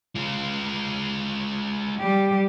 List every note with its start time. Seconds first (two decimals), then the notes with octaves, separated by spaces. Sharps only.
0.16 G#3 F4
2.00 G3 G4